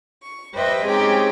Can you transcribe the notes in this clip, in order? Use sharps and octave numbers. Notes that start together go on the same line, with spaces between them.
C#6
G4 B4 C5 D#5 E5 G5
G#3 C4 C#4 D#4 G4 G#4